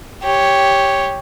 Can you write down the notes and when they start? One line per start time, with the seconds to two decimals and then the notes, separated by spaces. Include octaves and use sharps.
0.23 G4 C#5